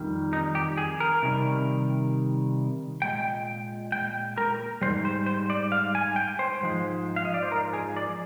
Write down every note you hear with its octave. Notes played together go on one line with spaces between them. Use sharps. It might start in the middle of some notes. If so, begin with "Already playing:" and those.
Already playing: F2 D#3 G3
D#4
G4
G#4
A#4
C3 D#3 G3
A#2 G#3 G5
G5
A#4
G#2 D#3 G3 C5
C5
C5
D5
F5
G#5
G5
C5
G#2 F3 G#3
F5
D#5
D5
C5
A#4
G#4
D5